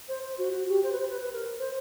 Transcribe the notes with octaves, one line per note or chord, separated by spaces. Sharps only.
C5
C5
F#4
F#4
G4
C5
B4
C5
B4
B4
A#4
C5